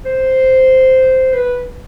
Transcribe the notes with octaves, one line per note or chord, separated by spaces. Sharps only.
C5
B4